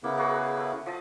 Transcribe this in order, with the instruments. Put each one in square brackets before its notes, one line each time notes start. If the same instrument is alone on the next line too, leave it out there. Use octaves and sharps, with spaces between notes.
[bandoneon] C#3 B3 E4 [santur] A#3
[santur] A#3 F#4 G#4
A3
F3 D#5 A5